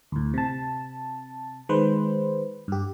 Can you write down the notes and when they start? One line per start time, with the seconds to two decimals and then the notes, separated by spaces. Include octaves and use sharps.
0.12 D2 A2
0.34 C3 A5
1.69 D#3 G#3 B4 C5
2.68 G2 G4